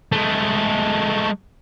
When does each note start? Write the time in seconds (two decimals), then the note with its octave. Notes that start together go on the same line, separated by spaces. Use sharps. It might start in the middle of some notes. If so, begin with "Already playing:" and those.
0.12 G#3 A3